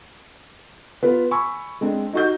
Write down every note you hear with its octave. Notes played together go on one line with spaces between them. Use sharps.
B3 F4 B4
G#5 B5 C#6 E6
G#3 C4 D4
D#4 F#4 G6